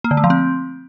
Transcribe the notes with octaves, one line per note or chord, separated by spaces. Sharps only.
A#3
D3
A3
F3
C4